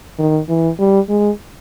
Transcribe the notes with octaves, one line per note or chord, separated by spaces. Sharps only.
D#3
E3
G3
G#3